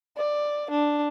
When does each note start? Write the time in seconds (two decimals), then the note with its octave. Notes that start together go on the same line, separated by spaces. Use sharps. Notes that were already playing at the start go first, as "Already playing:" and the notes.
0.17 D5
0.71 D4